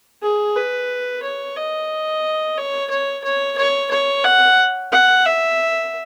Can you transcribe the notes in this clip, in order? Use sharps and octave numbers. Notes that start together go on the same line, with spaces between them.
G#4
B4
C#5
D#5
C#5
C#5
C#5
C#5
C#5
F#5
F#5
E5